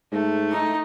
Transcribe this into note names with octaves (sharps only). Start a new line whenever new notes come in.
G#2 A3
D#4